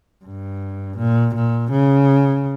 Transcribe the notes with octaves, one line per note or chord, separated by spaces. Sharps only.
G2
A#2
A#2
C#3